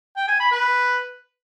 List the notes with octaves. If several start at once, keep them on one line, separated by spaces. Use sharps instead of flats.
G5
G#5
B5
B4